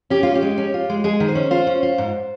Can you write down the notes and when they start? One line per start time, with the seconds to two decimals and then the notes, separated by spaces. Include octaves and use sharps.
0.10 C#4 G4
0.23 C#4 F4
0.35 G4
0.42 G#3
0.58 C#4
0.74 F4
0.89 G#3
1.04 G#3 G#4
1.20 D#3
1.28 C5
1.35 C#4
1.51 F4 C5
1.67 C#4
1.83 F4
1.98 G#2